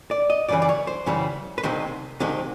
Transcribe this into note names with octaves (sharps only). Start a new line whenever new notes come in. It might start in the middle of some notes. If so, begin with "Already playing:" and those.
D5
D#5
F#2 C#3 E3 G3 D5
D5
C#5
C5
F#2 C#3 E3 G3
B4
C2 C3 D#3 G#3 C5
C2 C3 D#3 G#3